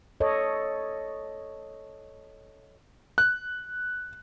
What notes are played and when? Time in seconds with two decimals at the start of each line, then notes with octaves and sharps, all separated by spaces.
0.20 A4 C#5 D#5
3.18 F#6